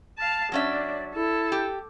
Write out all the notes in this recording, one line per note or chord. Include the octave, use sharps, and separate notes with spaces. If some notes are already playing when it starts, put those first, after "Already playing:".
F5 A5
F#3 C#4 D4 D5 E5
E4 A4
G4